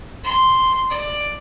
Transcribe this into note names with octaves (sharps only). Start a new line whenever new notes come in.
C6
D5